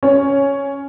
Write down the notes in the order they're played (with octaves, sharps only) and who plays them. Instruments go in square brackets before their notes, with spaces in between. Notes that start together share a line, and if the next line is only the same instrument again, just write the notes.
[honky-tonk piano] C#4